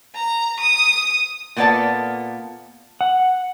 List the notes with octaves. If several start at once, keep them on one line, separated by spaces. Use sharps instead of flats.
A#5
D#6
A#2 A#3 B3 A4 D5 A5
F#5